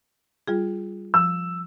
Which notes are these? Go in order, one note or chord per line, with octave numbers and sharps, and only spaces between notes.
G3 F4 G#4
F3 E6